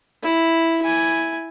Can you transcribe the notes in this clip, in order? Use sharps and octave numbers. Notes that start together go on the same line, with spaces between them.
E4
E4 G#5